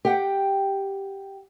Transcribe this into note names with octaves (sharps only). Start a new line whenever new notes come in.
G4 F#5 G5